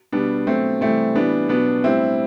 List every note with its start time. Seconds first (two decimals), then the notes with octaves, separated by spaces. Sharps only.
0.12 B2 G3 B3 D4
0.47 B2 F#3 A3 C4
0.81 C3 E3 G3 A3 C4
1.15 A2 E3 G3 B3 D4
1.49 B2 F#3 B3 D4
1.84 A2 G3 C4 E4